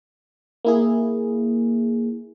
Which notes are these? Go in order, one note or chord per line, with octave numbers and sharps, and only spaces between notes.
A#3 E4 G#4